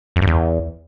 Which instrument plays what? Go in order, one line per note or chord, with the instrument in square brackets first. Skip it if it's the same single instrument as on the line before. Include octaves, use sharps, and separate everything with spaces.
[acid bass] F2
G2
E2